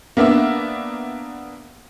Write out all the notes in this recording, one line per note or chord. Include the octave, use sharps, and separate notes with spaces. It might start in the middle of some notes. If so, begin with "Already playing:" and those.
A#3 B3 D4 E5